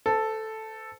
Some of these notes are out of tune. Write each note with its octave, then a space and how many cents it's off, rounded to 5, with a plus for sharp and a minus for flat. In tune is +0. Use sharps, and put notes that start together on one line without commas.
A4 +0 C5 -40